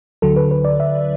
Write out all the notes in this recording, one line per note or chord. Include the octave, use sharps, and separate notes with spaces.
D2 D3 F#3 A4
B4
B4
D5
E5